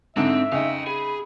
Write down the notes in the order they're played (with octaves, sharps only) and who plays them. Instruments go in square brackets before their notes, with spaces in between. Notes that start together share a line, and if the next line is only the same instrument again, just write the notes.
[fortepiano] G#2 D3 [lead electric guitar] C4 [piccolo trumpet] E5
[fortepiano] C#3 D#4 [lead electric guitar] F5 G5
[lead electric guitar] G#4 [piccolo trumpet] B5